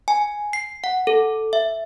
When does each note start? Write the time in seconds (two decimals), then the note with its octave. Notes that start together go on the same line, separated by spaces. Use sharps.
0.08 G#5
0.53 C7
0.84 F#5
1.07 A4
1.53 E5